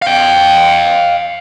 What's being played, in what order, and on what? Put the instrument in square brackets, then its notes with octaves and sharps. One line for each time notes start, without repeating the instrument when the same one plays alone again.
[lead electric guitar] F5 G5